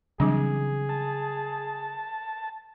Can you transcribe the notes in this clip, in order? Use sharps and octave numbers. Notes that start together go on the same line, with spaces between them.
C#3 E3 F#3 G3 C4 D4 G#4
A5